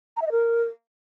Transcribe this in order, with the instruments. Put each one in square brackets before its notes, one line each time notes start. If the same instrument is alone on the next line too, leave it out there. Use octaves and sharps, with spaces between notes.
[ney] A#5
E5
D#5
A#4